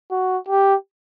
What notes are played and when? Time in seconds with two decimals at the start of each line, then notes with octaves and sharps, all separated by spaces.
0.11 F#4
0.49 G4